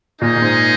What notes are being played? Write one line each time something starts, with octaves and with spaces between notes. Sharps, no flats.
A#2 A#3 D#4 G#4 C5 D#5
A#2
G#2